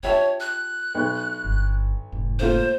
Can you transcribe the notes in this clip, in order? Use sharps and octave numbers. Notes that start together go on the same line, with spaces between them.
F4 G4 C#5 E5 A5
F#6
B1 B3
G1
F1 G#2
A3 A#3 F4 C5